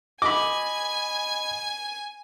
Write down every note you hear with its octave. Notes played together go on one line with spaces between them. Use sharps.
D#5 G#5 B5 D6